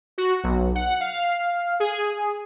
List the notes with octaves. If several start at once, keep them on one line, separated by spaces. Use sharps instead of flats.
F#4
B1
F#5
F5
G#4